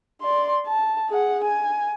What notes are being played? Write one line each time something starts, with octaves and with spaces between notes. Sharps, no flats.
D5 C6
A5
G#4 F#5
G#5